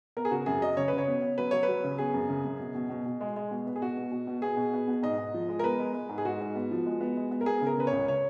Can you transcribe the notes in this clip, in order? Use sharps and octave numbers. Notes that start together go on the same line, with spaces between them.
B3 A#4
G#4
C#3 F#4
F#2 G#4
F#3 D#5
C#3 C#5
C#3 B4
C#5
B3
B3
F#3 B4
F#3 C#5
B4
F#3
C#3
B3 G#4
F#2
C#3
F#2
B2
B2
B2
B2
G#3
G#3
B2
B3
G#4
B2 F#4
B2
B2
B2
B3 G#4
B2
B3
B2
G#2 D#5
G#2
F3
G#3
A#4
B3 B4
G#3
G#3
G#2
G#4
G#3 F#4
G#2
B3
F3
G#3
B3
G#3
B3
A#4
B3 G#4
C#3
A#4
C#3 B4
C#5
C#2
C#5